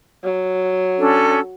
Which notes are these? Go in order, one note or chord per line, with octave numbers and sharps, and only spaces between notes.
F#3
C#4 D4 A4